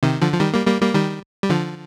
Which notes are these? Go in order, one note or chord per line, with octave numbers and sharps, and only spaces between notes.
C3 D#3
D3 F3
F3
D#3 G3
G3 A#3
G3 A#3
G3 A#3
D#3 G3
G3
D3 F3